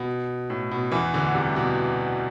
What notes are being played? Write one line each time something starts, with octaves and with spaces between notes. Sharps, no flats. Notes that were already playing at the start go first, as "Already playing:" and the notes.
Already playing: B2
A2
B2
E2 E3
D2 D3
C2 C3
B2